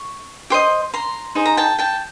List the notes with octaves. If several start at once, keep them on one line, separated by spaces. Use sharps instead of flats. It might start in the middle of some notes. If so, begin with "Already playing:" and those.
Already playing: C#6
G4 C5 D#5
A#5 C6
D#4 G#4 C5
A#5
G5 A5
G5 A5